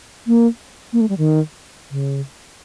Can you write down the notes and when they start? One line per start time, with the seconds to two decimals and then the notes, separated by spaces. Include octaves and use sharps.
0.27 A#3
0.93 A#3
1.01 A3
1.09 G3
1.18 D#3
1.91 C#3